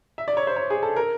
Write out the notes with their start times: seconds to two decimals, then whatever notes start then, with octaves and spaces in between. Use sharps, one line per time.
0.18 E5
0.28 D5
0.37 C#5
0.47 C5
0.56 C#5
0.70 G#4
0.83 A4
0.96 A#4